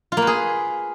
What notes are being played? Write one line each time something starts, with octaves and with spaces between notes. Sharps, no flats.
F4
A#3
B4
G#4